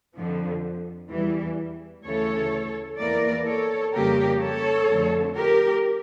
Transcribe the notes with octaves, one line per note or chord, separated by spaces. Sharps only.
F2 D3 F3
E2 E3 G3
D2 C#3 E3 A4 C#5
E2 E3 A#3 A#4 D5
A4 C#5
F2 C#3 G3 A#3 G4 A#4
A4 C#5
F2 D3 A3
G4 A#4